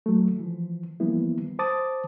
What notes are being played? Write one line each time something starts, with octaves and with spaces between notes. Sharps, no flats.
F#3 A3
E3 F3
E3 F3 G3 A#3 B3 E4
C5 A5 D6 D#6 A6